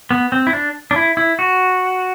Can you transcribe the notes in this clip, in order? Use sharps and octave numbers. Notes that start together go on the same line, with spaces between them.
B3
C4
E4
D4
D4
E4
E4
F#4